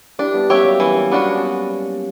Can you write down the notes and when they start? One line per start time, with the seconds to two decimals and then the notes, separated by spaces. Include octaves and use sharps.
0.19 D4 E4 G4
0.34 G3 B3
0.50 A#3 C#4 G4 C#5 E5
0.65 F#3 A#3
0.80 E3 G3 B3
0.95 A#3 C#4
1.11 A#3 B3 C#4 D4 F#4